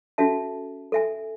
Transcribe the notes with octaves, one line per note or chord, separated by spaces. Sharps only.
C#4 F#4 A4 E5 A5
A4 E5 G#5